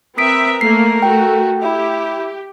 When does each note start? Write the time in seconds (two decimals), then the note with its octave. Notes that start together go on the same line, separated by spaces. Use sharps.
0.18 C4 A#4 B4 E5 D#6 B6 D7
0.61 A3 A#3 C7
1.02 A3 F#4 G5
1.62 E4 G4